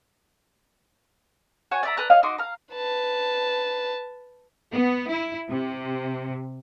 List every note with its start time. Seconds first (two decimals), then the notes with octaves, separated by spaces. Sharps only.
1.71 F#4 C#5 G#5
1.83 D5 E5 A#5
1.97 B4 D5 A#5 F#6
2.10 C#5 D#5 F5
2.23 D#4 F#4 C6 D6
2.38 F5 A#5
2.73 B4 A5
4.74 B3
5.11 E4
5.48 C3